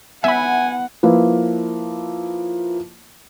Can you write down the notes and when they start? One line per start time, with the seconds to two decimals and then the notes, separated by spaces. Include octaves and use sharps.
0.24 B3 E5 F#5 G#5 B5
1.03 F3 A#3 E4 B4